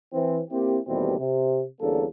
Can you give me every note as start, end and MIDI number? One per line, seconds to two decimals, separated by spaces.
0.13 0.39 52
0.13 0.39 60
0.51 0.78 58
0.51 0.78 60
0.51 0.78 64
0.51 0.78 67
0.88 1.16 39
0.88 1.16 47
0.88 1.16 52
0.88 1.16 55
0.88 1.16 57
0.88 1.16 60
1.18 1.64 48
1.81 2.04 40
1.81 2.04 50
1.81 2.04 55
1.81 2.04 58
1.81 2.04 61
1.81 2.04 69